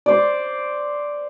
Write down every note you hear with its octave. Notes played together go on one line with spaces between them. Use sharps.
C5 D5